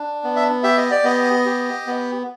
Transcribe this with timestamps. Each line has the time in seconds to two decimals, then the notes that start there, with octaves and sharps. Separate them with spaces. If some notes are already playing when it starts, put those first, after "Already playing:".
Already playing: D4
0.24 B3
0.36 E5
0.63 G4 E5
0.77 D#5
0.91 D5
1.04 B3 D#5
1.46 G4
1.87 B3